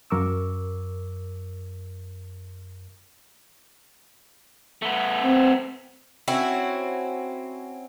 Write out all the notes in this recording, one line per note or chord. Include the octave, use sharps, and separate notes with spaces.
F#2 A#4 C#6 D6 E6
A3 B3
C4
C4 C#4 E4 F#4